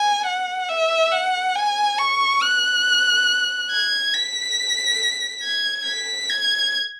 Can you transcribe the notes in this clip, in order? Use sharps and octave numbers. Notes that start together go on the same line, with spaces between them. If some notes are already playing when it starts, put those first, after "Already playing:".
Already playing: G#5
F#5
E5
F#5
G#5
C#6
F#6
G#6
B6
G#6
B6
G#6